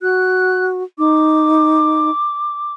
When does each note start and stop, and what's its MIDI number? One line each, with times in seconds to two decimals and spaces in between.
0.01 0.84 66
0.01 0.65 90
0.98 2.10 63
0.98 2.74 86